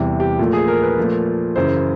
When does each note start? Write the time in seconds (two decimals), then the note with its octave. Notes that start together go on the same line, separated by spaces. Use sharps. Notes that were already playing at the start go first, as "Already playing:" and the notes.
Already playing: E2 C3 E3 G3
0.20 G4
0.39 A#2 F3 A3
0.53 G#4
0.68 A#4
0.83 B4
0.97 A#2 F3 A3
1.56 F#2 C#3 E3 C5